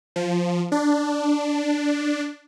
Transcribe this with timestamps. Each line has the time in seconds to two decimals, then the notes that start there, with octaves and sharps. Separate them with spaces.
0.16 F3
0.72 D4